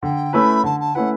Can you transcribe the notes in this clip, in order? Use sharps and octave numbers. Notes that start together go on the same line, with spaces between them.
D3 G5
A3 C#4 E4 B4 B5
D3 A5
A5
A3 C#4 E4 B4 F#5